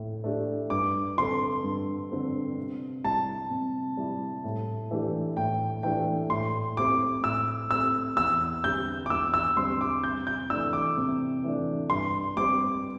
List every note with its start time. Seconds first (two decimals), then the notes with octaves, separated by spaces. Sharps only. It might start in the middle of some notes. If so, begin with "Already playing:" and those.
Already playing: A2
0.24 A3 D4 G4
0.70 G2 D6
1.17 D3 C4 A4 C6
1.64 G2
2.11 D3 C4 A4
2.57 C3
3.04 G3 E4 A5
3.51 C3
3.97 G3 E4
4.44 A2
4.91 E3 A3 D4 G4
5.37 A2 G5
5.83 E3 A3 D4 G4 G5
6.30 A2 C6
6.77 A3 C4 G4 D6
7.24 A2 E6
7.71 A3 C4 G4 E6
8.17 E2 E6
8.63 D3 G3 C4 G4 G6
9.06 D6
9.10 E2 E6
9.34 E6
9.57 D3 G3 C4 G4 C6
9.81 D6
10.04 C3 G6
10.27 G6
10.50 E3 A3 D4 E6
10.73 D6
10.97 C3
11.44 E3 A3 D4
11.90 G2 C6
12.37 G3 C4 G4 D6